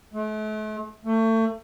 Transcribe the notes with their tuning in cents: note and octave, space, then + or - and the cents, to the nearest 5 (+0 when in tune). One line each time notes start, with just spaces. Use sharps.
A3 -40
A3 +30